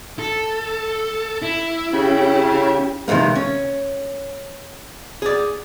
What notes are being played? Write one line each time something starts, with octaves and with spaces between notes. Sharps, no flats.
A4
E4
C#3 C#4 G4
C3 D#3 E3 G#3 A#3
C#4
G#4 D5